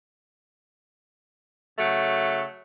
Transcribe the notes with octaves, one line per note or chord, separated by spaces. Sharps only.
C#3 F#3 A3